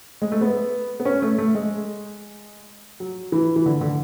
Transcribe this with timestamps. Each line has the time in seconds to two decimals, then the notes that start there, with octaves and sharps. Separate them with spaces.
0.22 G#3
0.32 A3
0.41 B3
1.00 B3
1.05 C#4
1.22 A3
1.38 A3
1.55 G#3
3.00 F#3
3.32 E3
3.56 E3
3.66 D3
3.81 D3